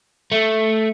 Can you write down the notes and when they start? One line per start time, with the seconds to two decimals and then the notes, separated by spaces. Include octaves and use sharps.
0.32 A3